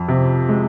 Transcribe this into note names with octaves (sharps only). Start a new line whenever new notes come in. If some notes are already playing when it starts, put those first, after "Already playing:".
Already playing: F2
C3
G#3